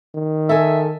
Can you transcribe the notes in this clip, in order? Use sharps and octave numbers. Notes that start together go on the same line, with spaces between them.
D#3
A4 E5 G#5